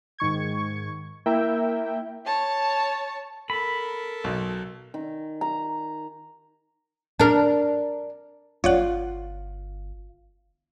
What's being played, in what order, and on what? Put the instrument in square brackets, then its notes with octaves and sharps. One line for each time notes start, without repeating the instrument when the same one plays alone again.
[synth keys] G#2 D#3 C#6 G#6
A#3 E4 A#4 E5 G5
[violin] C#5 A5
[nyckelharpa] A4 A#4 [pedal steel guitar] B5
[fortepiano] B1
[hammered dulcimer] D#3
A#5
[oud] D4 A#4
[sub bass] G1 [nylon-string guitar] F4 [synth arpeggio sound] C#5 D5 F#5